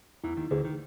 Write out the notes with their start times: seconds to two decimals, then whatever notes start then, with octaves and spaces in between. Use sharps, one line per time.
0.24 E2 E3 E4
0.37 D#2 D#3
0.51 D2 D3 G#4 C5
0.65 D#3